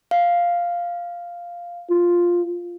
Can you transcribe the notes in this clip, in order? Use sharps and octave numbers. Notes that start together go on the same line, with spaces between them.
F5
F4